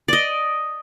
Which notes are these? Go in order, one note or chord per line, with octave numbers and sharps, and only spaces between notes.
D5 D#5